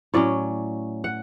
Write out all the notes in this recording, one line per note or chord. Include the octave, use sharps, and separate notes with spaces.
A2 F#3 C#4 D5
F#5